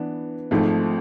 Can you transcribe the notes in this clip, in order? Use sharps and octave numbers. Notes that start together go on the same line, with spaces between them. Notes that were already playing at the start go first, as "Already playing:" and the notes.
Already playing: E3 B3 D4
G#1 G#2 F3 A3